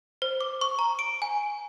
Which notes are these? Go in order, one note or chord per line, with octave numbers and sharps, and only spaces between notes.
C5
D6
C#6
A#5
D7
G#5